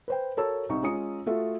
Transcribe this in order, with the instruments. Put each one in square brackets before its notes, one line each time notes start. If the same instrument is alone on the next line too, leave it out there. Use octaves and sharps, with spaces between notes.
[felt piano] B4 C5 G5
F#4 A4 A#4 C#5 A5 E6
C2 D#4 C#6
G#3 C#4 F4 A#5 D#6 C#7
A3 F4 F#4 A4 E5